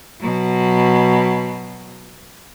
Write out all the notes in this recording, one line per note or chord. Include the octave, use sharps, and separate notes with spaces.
B2 F#3